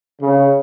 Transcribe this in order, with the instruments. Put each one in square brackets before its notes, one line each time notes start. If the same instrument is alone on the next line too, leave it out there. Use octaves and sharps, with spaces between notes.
[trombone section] C#3